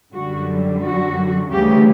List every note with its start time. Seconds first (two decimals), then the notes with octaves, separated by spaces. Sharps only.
0.15 F#2 D3 G3 F#4
0.83 F#4
1.50 D2 C#3 E3 G3 G4